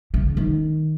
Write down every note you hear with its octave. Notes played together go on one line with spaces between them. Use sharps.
C#3
D#3